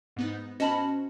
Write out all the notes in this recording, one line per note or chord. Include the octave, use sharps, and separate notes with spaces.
G#2 B3 D#4
C#4 F#4 C5 D#5 A5 B5